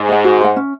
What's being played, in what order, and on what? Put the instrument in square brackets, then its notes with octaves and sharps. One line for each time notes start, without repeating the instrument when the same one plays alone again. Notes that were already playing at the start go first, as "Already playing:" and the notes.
Already playing: [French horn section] G#2
[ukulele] C5 F#5
F#4
C5 F#5
C#4